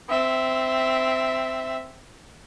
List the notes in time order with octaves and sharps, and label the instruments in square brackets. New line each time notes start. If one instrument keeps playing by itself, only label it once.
[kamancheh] C4 E5